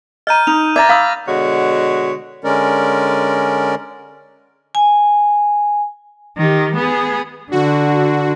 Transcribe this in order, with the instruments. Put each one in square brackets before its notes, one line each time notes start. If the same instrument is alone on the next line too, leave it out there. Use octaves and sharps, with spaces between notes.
[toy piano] D#5 A#5 [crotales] F6 G6 D#7
[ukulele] D#4 [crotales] F7
[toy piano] D5 A#5 [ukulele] E5 [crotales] D6 A6 A#6
[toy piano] F5 D#6 E6 [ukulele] B5
[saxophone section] B2 D3 G#3 C#5 F#5
[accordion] D3 G#3 C#4 A#4 D5
[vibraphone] G#5
[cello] D#3 G4
B3 G#4
[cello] D3 [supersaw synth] F#4